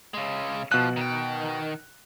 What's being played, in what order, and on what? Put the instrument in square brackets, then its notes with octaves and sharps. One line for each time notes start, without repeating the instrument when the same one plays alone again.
[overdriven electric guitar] C#3 G#3
[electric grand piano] B2 F#6 [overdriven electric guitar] F3
[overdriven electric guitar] D#3 G5